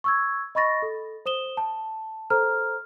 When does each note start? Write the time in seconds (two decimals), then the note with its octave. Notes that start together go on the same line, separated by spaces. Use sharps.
0.04 C#6 E6 G#6
0.55 D#5 B5 C#6 A6 A#6
0.82 A4
1.26 C5 D#6 E7 G7
1.57 A5
2.30 A4 C5 A#5 F6